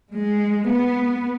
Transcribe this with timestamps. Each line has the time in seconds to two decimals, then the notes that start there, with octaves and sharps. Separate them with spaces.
0.13 G#3
0.69 B3